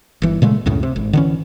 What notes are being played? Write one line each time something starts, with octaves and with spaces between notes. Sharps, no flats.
G1 E3
A#2 C#3 G#3 A3
C#2 F#2 A2 C#3
C3
G#1
D3 E3 C#4